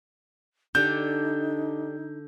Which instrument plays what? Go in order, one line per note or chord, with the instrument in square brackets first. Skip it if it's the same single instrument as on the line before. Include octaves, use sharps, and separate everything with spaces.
[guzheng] D3 [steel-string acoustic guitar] D4 G4 A4 [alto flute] D#4 [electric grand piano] G6